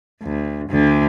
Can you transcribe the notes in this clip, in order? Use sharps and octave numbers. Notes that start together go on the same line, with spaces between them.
D2
D2 D3